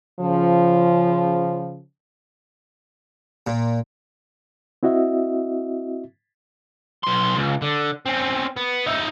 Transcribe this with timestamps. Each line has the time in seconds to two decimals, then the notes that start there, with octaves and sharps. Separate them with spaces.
0.20 C#3 F3
3.47 A#2
4.83 C4 E4 F#4 D#5 E5
7.03 B1 C6
7.36 C#2
7.62 D3
8.06 C4 C#4
8.57 B3
8.87 D#4 E5